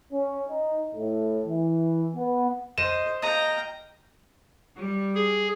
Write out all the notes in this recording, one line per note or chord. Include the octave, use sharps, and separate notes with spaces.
C#4
D#4
A2
E3
B3
C5 D#5 E7
D#5 F5 G5 A#5
G3
G#4